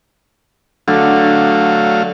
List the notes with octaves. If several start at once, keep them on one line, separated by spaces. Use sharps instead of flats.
D3 F#3 A3 F5